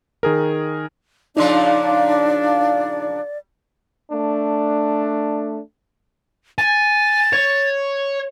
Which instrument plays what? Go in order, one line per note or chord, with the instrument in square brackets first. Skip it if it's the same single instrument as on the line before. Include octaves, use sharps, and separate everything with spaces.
[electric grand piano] D#3 G#4 A#4
[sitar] A#2 C#3 F3 [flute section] D4 [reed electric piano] D#4 C6 [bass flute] D5
[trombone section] A3 D4
[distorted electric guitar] G#5 [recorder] A6
[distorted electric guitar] C#5